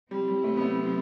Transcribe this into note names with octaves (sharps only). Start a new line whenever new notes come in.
C3 F#3 G3 C4 E4
G3
A3
B3
A3